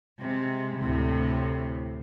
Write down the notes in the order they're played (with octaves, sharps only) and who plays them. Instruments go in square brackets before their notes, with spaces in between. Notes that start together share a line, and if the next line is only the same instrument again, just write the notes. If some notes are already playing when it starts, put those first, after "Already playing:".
[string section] C3 G#3
D2 A2 C3